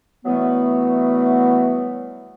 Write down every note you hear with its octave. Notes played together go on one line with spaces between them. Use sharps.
E3 F#3 G3 A3 B3